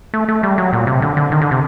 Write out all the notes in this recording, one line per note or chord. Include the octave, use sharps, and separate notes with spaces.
A3
A3
G3
F#3
A#2
C3
D3
D3
D#3
D3
C3